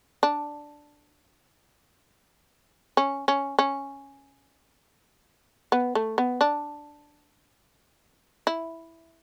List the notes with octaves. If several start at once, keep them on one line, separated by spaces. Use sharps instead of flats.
D4
C#4
C#4
C#4
B3
A3
B3
D4
E4